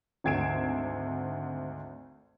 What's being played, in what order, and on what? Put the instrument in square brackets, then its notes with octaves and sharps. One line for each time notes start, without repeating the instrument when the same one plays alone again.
[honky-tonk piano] G#1 D2 G#6 C7 D7 E7